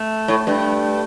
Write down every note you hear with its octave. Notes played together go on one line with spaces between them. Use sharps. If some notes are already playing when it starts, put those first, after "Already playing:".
Already playing: A3
A2
G2